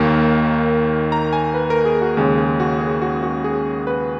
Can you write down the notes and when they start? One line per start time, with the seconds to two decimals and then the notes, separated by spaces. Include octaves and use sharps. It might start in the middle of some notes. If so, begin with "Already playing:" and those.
Already playing: D#2 D#3 A#3
1.12 A#5
1.33 G#5
1.54 B4
1.70 A#4
1.85 G#4
2.02 F#4
2.17 D#2 C#3 G#3 G#4
2.38 G#4
2.60 F#4
2.81 G#4
3.02 F#4
3.23 F#4
3.44 G#4
3.87 B4